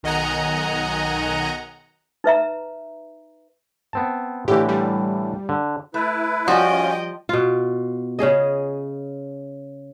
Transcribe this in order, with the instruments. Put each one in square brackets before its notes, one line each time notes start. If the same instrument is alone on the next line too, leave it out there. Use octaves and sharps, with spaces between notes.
[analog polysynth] B1 D#3 D#5 F#5 G#5 A#5
[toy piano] D#4 B4 E5 A#5
[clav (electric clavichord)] B3 C4 A5
[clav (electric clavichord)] A2 D3 E3 [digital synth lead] G4
[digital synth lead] G3
[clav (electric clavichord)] D3
[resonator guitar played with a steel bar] A3 [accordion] E4 B4
[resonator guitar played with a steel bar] F3 G3 [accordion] C#4 F4 [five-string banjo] F#4 [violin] D#5 G5
[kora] B2 F4
C#3 C#4 G#4 D#5